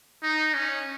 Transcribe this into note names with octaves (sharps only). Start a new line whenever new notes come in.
D#4
C#4